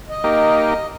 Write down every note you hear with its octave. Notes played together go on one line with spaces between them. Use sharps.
D#5
A#3 D#4 G4